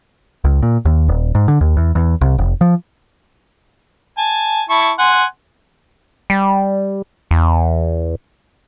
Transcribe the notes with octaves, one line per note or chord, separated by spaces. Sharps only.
C#2
A#2
D#2
D#1
G#2
D3
D#2
E2
E2
C2
F1
F3
G#5 A5
E4 A5 C#6
F#5 G#5 C6
G3
E2